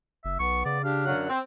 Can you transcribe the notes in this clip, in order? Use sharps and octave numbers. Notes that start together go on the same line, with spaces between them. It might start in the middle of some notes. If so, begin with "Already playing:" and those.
F#1 E5
B1 B3 C#6
C#3 D5
D4 G4 F5
F#2 D3 F#3 F#6
C4